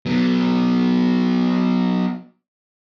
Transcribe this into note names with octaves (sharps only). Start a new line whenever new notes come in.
F#3 B3